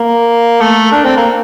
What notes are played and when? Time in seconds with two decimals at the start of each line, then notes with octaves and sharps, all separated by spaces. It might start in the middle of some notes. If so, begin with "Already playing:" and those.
Already playing: A#3
0.61 A3
0.92 D4
1.05 C4
1.17 A#3